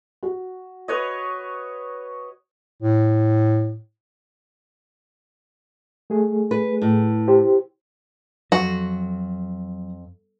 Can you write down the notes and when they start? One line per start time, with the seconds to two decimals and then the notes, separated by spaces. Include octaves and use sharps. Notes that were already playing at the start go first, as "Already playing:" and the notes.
0.23 F#4
0.88 B4 C#5 D#5
2.82 A2
6.10 A3 G#4
6.51 B4
6.82 A2
7.28 G4 C5
8.52 F2 F#3 F#4